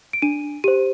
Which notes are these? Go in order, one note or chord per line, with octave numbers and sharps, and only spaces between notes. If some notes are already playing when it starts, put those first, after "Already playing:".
D7
D4 D#7
G4 C5 D#7